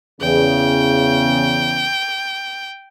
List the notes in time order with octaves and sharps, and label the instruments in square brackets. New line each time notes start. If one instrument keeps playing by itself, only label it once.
[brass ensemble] E2 C#3 [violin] G5